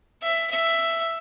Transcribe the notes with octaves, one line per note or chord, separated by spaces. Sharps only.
E5
E5